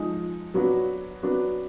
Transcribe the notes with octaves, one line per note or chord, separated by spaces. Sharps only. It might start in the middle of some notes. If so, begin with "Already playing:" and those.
Already playing: F3 G#3 D#4
F#3 B3 D4 F#4
F#3 B3 D4 F#4